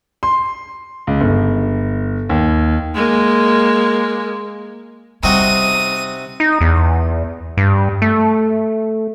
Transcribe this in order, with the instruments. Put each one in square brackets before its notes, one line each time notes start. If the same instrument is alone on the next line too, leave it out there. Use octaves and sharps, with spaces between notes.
[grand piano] C6
C#2
G1
D#2
[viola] G#3 A#3
[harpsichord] C3 D#4 F#4 [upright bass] G3 [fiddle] D#6
[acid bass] D#4
E2
G2
A3